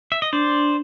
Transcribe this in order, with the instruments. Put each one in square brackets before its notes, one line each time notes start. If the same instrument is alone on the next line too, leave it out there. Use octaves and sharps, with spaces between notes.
[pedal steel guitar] E5
D#5
[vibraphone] D4 [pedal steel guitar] C5 D5